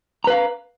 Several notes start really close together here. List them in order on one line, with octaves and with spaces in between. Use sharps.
A#5 B4 F5